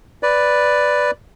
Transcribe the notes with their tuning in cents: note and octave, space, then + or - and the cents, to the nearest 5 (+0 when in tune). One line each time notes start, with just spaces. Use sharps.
B4 +0 D5 +0